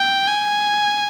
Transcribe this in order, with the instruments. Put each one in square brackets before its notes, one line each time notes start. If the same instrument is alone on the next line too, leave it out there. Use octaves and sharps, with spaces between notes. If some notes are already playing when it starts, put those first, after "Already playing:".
Already playing: [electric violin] G5
G#5